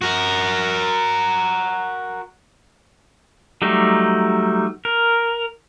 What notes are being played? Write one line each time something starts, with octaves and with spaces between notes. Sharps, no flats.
F#4 A#4
F#3 G3 A3 D#4
A#4